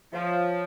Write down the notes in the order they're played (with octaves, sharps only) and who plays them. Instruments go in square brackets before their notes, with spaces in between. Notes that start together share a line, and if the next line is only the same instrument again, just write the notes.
[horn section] F3 [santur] F4 C#5 E5